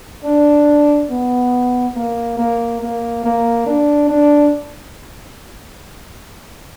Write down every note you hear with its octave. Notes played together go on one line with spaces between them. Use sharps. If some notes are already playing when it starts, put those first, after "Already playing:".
D4
B3
A#3
A#3
A#3
A#3
D4
D4